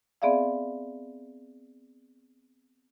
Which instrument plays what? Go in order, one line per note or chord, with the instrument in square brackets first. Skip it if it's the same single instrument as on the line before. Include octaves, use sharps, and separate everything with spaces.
[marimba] B3 C4 G#4 D5 E5 F5